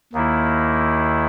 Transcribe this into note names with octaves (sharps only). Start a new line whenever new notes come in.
D#2 D#3 A#3 E4